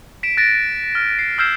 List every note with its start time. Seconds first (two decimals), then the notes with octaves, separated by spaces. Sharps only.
0.23 B6 D7 E7
0.37 F#6 A6 A#6 D7
0.95 F6
1.19 C7
1.38 E6 F6 G6 G#6 C7 E7